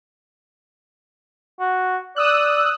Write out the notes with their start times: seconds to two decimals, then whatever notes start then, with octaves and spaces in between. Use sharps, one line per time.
1.60 F#4
2.16 D5 D#6 E6 F#6